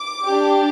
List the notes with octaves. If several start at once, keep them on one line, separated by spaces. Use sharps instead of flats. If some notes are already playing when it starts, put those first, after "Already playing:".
Already playing: D6
D4 G4